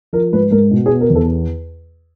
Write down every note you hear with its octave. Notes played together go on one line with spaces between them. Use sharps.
F3 A#4
G#2 B4
G#2 A#4
B2
G#4
B3
A#4
E2
A4